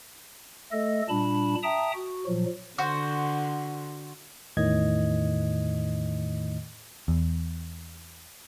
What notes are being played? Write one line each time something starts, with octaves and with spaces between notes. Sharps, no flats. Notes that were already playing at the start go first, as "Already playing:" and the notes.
A3 A4 D#5
A#2 G3 D4 A5 B5
E5 G5 A5 A#5 D#6
F#4
A#2 F3 F#3
D3 F#4 C5
E2 A2 D#3 D#5 G#6
E2